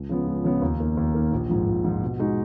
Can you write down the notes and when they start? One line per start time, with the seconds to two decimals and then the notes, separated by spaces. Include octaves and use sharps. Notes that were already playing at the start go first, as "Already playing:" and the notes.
Already playing: C#2
0.09 C#3 F3 B3
0.27 C#2
0.44 C#3 F3 B3
0.62 D#2
0.79 D#3 A#3
0.97 D#2
1.15 D#3 A#3
1.32 A#1
1.49 G#2 F3
1.67 A#1
1.84 G#2 F3
2.02 B2
2.19 G#3 D#4 F#4